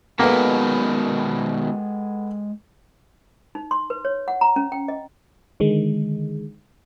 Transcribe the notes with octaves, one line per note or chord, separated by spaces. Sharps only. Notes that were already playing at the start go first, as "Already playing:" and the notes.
B2 D#3 G#3 A#3 B3 G4 A4 B4
D#4
C6
B4
C#5
F#5
A#5
C#4
G5
D#5
D3 D#3 G#3